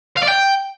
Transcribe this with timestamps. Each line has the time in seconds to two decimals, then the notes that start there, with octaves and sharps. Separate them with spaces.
0.17 F5
0.23 D5
0.29 G5